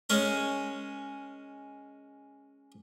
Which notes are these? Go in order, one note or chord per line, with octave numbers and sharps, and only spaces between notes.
G#3 C#4 A#4